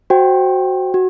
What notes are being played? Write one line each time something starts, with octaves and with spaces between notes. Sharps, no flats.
F#4 C5 G5
F#4